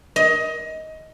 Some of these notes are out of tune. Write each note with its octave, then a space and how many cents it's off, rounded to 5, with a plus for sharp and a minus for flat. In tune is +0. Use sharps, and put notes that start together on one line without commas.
D#5 +20